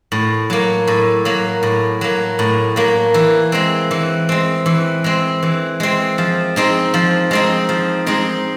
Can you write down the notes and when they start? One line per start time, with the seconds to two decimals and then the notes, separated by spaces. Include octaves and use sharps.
0.12 A2
0.50 F#3 A#3
0.87 A2
1.25 F#3 A#3
1.63 A2
2.01 F#3 A#3
2.39 A2
2.76 F#3 A#3
3.14 E3
3.52 G#3 C4
3.91 E3
4.29 G#3 C4
4.66 E3
5.04 G#3 C4
5.43 E3
5.80 G#3 C4
6.18 F3
6.56 G#3 C4 D#4
6.94 F3
7.31 G#3 C4 D#4
7.69 F3
8.06 G#3 C4 D#4